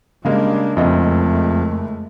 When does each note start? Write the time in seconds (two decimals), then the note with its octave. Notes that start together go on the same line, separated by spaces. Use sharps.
0.25 C#3 G3 G#3 A#3 D4
0.77 F#1 F2 G#3 A3 D#5 E5